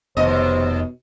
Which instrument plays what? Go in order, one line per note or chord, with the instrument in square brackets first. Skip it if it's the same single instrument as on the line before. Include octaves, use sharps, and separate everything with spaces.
[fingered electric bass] F1 [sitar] D#2 D#5 [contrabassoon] B2 [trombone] C5